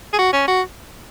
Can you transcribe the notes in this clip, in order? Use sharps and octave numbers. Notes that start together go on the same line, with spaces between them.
G#4
F#4
C#4
F#4